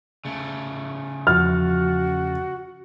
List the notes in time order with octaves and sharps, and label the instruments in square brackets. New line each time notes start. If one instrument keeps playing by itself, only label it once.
[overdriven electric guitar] C#3 A3
[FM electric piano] E2 F3 A6 [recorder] F#4 [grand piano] F6